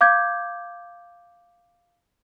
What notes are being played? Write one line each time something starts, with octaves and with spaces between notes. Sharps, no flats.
F5 D6 G6 G#6